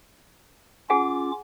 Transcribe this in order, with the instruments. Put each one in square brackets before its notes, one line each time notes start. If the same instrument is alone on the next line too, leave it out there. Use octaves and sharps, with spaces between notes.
[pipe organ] C#4 F4 D6 [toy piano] G#4 F#5 G#5